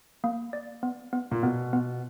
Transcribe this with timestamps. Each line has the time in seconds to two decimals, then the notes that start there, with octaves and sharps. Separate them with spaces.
0.24 A#3
0.53 D5
0.83 B3
1.13 B3
1.31 A#2
1.43 B2 B3
1.73 B3